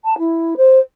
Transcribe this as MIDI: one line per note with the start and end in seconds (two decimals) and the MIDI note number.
0.05 0.18 81
0.18 0.54 64
0.57 0.79 72